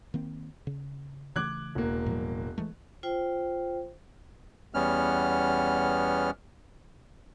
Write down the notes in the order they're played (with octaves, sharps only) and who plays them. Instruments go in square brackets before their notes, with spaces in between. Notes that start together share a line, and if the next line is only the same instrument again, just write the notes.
[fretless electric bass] D#3 A#3 C4
C#3
[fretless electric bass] C#3 E3 A3 [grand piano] D6 F#6 G#6
[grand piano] E1 A#3
[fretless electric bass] A2 F3 G3
E3 G#3 A3
[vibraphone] F4 C5 G5
[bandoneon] E2 G3 B3 C#4 F6